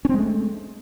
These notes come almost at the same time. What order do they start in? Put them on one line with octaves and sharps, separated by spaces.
C#4 C4 G#3 A3